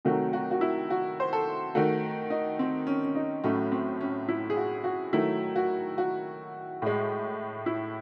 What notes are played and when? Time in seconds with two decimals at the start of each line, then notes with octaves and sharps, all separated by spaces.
0.05 C3 D#3 F#3 A3 F#4
0.33 F#4
0.51 F#4
0.61 E4
0.90 F#4
1.20 C5
1.33 A4
1.75 D#3 A3 F#4
2.30 D#4
2.59 C4
2.87 C#4
3.05 C#4
3.15 D#4
3.44 A2 F#3 A3 C#4
3.72 C4
4.01 C#4
4.28 E4
4.50 G#4
4.57 F#4
4.84 F#4
5.13 D#3 F#3 A3 E4
5.56 F#4
5.98 F#4
6.82 A2 G#3
7.66 E4